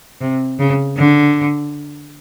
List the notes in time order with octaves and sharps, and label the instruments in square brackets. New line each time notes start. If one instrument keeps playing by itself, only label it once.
[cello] C3
C#3
D3